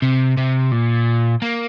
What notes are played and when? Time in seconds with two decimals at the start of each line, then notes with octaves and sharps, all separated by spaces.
0.02 C3
0.37 C3
0.72 A#2
1.42 A#3